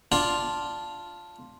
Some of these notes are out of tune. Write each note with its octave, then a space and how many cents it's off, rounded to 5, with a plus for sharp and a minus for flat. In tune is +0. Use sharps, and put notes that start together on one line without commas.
D4 +0 F4 +0 F5 +0